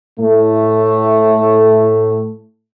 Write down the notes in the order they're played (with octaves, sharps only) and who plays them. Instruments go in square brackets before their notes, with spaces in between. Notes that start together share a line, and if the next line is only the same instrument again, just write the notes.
[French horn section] A2 A3